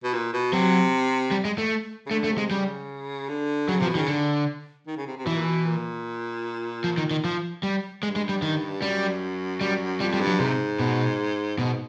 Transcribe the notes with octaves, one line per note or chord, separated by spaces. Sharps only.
B2
A#2
B2
C3 F#3
G3
G#3
A3
C#3
D3 A3
A3
C3
G#3
C#3 G3
D3
C#3 F#3
C3 F3
B2
D#3
C#3
D3
D#3
C#3
C3
C3
B2 E3
A#2
B2
A#2
F3
D#3
D#3
F3
G3
G2 G#3
G#3
G3
D#3
F#2 G3
G3
F2 G3
G3
G2
F#3
G#2 C3
B2
G#2 B2